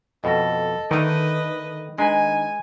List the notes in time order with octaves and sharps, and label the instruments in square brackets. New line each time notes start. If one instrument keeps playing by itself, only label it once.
[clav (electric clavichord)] F2 B2 [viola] A4 [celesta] D#5 A#6
[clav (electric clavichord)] D3 A3 D#4 [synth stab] D#3 [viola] B4 D#5 [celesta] D7 D#7
[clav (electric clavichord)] G#3 B4 [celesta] D4 D#5 A#5 [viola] G#5